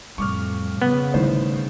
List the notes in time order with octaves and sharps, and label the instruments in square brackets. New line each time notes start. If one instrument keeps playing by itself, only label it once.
[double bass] F2 [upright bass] A2 G3 [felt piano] C#6 D6 F6
[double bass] C#3 [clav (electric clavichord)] B3
[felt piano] G#1 A2 C5 [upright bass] G3